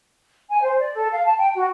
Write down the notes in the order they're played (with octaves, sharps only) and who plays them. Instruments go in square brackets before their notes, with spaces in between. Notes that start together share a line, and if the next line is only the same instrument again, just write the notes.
[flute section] G#5
C5
D5
A4
F5
A5
G5
F#4